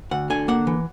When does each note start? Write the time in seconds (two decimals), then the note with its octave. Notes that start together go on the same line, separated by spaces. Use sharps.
0.11 D2 F#5
0.30 D3 G#5
0.48 A#3 F#5
0.67 E3